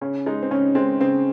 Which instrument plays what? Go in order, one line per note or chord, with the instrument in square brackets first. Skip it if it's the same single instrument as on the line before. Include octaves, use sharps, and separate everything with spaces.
[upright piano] C#3 C#4
G#3 D#4
C4
C#3 C#4
G#3 C4
C#3 C4